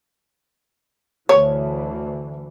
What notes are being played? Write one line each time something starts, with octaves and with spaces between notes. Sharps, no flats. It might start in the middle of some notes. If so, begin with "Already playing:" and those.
D2 E3 C#5